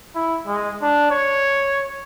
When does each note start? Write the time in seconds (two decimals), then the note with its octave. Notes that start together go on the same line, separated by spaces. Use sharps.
0.15 E4
0.47 G#3
0.82 D4
1.11 C#5